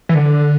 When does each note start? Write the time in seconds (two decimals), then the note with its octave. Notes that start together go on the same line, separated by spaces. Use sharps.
0.09 E3
0.15 D3